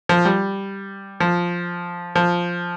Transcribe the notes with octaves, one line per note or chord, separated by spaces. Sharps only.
F3
G3
F3
F3